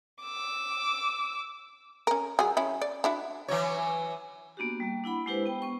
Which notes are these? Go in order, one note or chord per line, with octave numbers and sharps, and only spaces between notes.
D6 E6
C#4 A#4
F#3 G#4
F#3 C#4 E4
D5
D4 E4 F#4
E3 F#3 C#5
A#3 B3 D4 F#4 G4
G3 A#3
D4 E4 F#5 B5
G#3 D4 E4 G4 B4 C5
B3 G5
B3 C#6